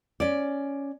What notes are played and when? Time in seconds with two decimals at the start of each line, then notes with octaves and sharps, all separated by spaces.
0.20 C#4 D5